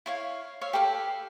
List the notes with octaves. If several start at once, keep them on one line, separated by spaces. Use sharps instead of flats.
E4 C#5 F5
C#5 E5 F5
G4 A4 B4 F5